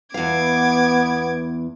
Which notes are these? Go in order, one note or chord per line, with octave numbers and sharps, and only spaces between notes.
E2 B3 F5 D6 G#6